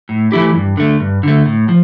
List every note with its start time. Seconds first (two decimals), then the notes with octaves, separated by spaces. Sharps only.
0.09 A2
0.32 E3 A3 E4 G4
0.55 G2
0.77 D3 A3
1.00 G2
1.23 D3 A3
1.46 A2
1.69 F3